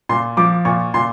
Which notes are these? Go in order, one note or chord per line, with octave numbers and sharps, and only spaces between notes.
A#2 C6
F3 D6
A#2 C#6
A#2 C6